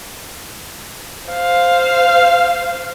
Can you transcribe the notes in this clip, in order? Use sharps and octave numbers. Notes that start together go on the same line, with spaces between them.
C5 F5